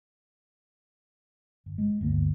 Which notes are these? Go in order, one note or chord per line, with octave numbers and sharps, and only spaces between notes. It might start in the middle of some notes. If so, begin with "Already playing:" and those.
G1
G#3
G1 D2 A#3